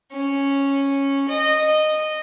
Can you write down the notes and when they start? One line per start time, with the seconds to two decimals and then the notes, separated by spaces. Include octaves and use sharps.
0.12 C#4
1.28 D#5